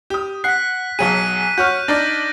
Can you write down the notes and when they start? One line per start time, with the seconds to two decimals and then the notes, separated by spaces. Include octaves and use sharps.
0.10 G4 D#6
0.44 F#5 F#6 B6 C7
0.99 B1 F#3 G#4 B6 D#7
1.58 F#4 C#5 F6 G6
1.88 D4 D#4 D5 A#6